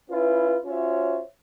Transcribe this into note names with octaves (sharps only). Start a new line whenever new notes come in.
C#4 E4 F4 B4
C#4 F4 F#4 C5 C#5 E5